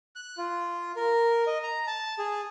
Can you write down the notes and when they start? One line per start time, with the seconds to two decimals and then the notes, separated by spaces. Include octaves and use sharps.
0.16 F#6
0.38 F4
0.96 A#4
1.47 D#5
1.63 A#5
1.87 A5
2.19 G#4